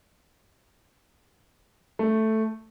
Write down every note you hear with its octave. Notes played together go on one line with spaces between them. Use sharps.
A3